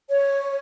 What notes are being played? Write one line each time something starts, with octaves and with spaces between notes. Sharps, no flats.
C#5